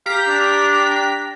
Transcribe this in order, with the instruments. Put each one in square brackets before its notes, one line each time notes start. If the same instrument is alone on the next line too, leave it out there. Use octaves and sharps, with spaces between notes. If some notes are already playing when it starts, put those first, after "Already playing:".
[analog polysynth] G4 A#5 B6 [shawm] F5
[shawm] D4